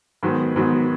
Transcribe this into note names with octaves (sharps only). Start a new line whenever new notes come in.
G#2 D#3 F#3 B3
G#2 D#3 F#3 B3